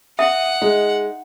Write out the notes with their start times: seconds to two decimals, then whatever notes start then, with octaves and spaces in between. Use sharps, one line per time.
0.19 E5 F#5 D#6
0.62 G#3 D#4